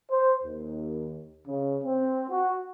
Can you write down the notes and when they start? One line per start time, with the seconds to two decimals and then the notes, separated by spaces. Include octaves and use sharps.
0.10 C5
0.43 D#2
1.47 C#3
1.84 C4
2.30 F#4